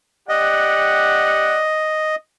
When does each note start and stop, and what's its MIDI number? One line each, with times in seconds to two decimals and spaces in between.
0.29 1.62 67
0.29 1.62 74
0.29 2.16 75
0.29 1.62 78